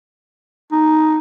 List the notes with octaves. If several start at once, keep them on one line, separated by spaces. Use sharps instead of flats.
D#4